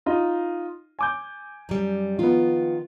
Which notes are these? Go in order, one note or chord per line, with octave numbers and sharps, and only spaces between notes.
D#4 F4 D#5
G#5 D6 G6
F#2 G3
D#3 F3 B3 F4